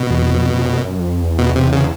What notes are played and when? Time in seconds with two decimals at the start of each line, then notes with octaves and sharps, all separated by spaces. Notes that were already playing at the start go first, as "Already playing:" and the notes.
Already playing: B2
0.10 E2
0.32 F2
0.54 F2
0.77 F#2
0.99 F2
1.22 E2
1.38 B2
1.55 C3
1.72 C#3